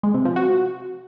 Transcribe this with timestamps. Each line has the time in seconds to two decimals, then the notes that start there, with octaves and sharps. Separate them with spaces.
0.03 G#3
0.14 C3
0.25 F3
0.36 F#4